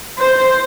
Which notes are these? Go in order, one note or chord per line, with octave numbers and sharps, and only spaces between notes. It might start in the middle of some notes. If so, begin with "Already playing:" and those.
C5